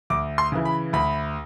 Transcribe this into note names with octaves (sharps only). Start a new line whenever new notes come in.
D2 D6
C6
C#3 E3
B5
D2 B5